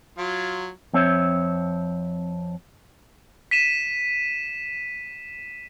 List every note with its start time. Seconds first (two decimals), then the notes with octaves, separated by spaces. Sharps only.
0.18 F#3 F4
0.93 F2 C4 C#5 E5
3.51 B6 D#7 E7